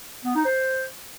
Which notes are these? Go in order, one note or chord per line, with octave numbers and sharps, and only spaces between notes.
B3
D#4
C5